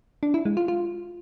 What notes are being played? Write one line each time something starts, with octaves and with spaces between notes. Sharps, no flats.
D4
E4
G#3
F4
F4